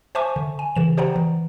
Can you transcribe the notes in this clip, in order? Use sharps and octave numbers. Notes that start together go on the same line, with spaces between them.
C5 E5 G#5 A5 C#6 D6
D3
G#5
C#3 E3 E7
G4 C5 D5 F#5 G5 A#5
E3